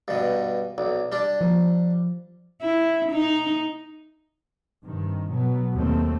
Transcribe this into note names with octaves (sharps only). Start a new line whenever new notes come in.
G2 B2
B1 D5
G3 D4
F3
E4
D#4
G2 C3 D#3
B2 F#3 B3
D#2 A#2 F#3 A3 C4